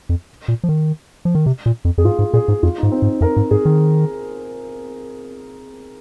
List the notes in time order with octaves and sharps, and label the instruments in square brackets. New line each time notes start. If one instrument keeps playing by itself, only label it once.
[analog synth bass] F2
A#2
F3
D#3
F3
D#3
C3
A#2
F2
[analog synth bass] F2 [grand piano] G#4
[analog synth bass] G#2 [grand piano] F4
[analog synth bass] G#2
[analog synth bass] A#2 [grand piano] G#4
[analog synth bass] G#2
[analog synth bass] F2 [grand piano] F4
[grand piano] D#4
[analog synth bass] G#2
[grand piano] C4
[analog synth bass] G#2
[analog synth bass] F2 [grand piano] A#4
[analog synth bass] G#2
[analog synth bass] G#2 [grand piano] G#4
[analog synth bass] D#3